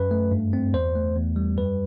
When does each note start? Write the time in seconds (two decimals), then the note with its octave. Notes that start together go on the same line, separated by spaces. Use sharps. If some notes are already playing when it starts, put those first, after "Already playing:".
Already playing: F#2 B4
0.11 A3
0.32 G2
0.53 C4
0.73 E2 C5
0.95 A3
1.16 E2
1.36 G3
1.57 F#2 B4